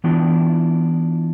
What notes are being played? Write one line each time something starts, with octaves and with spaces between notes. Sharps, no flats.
E3 B3 D4 E4 F4 G5